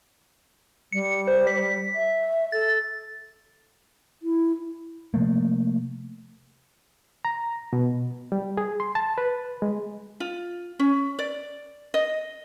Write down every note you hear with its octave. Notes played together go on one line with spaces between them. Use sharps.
G3 C#7
C5
B6
E5
A4 A6
E4
C3 F3 A3 A#3
A#5
B2
G3
G#4
C6
A5
B4
G#3
F4
C#4
D5
D#5